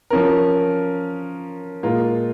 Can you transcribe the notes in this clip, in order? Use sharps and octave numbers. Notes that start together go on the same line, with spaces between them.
F3 C#4 A#4
A#2 G#3 F4 A#4